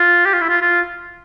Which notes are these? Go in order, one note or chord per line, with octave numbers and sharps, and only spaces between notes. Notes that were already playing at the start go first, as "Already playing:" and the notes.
Already playing: F4
G4
F4
E4
F4
F4